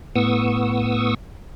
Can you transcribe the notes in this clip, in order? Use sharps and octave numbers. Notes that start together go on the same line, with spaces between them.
A2 B3 C#6 D#6 E6